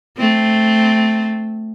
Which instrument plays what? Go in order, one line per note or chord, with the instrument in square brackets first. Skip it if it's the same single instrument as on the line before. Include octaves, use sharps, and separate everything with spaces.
[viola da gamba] A3 C4